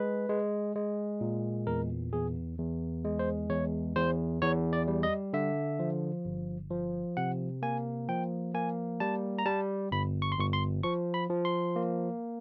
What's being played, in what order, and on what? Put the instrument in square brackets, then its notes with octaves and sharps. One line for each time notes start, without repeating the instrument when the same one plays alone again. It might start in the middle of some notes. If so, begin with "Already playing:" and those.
Already playing: [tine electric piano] G#3 B4
G#3
G#3
A#2
E2 A#4
E2 G#4
E2
G#3
C5
E2 C#5
E2 C5
E2 C#5
D5
G3
D#5
D3 E5
F3
G1
F3
C3 F#5
A#3 G#5
F3 G5
A#3 G#5
G3 A5
A#5
G3 A5
G1 B5
C#6
C6
G1 C#6
C6
F3 C#6
B5
F3
C6
A#3